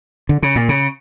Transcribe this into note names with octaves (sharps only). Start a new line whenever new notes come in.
D3
C#3
A#2
C#3